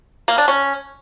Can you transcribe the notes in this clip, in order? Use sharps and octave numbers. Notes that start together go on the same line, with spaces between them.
A#3
D4
C#4